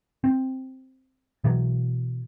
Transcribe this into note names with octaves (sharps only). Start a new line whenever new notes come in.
C4
B2 E3 F#3